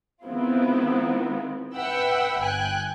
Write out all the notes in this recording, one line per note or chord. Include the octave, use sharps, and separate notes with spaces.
D#3 G#3 B3 C4 E4 F4
B4 E5 F#5 G5 B5 E6
G1 G5 G#5 F#6